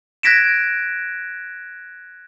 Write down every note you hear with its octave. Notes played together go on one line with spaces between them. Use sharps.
F#6 G#6 A#6 B6 D7 E7